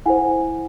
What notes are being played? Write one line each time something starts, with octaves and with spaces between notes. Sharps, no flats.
E4 A4 C5 F#5 G#5